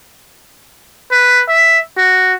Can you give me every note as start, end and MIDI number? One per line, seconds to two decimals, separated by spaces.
1.11 1.42 71
1.49 1.79 76
1.97 2.34 66